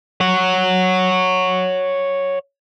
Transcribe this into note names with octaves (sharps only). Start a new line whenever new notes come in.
C#5 F#5